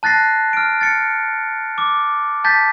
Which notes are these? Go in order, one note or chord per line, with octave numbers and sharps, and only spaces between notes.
A5 F#6 A6 A#6 C7
F6 D7
A6 C#7
D6
A5 G6 A6 B6